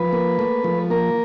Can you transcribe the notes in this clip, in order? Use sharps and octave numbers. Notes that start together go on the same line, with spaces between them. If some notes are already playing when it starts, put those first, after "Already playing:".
Already playing: F3 B4
A#3
A3
F3
A#3 A#4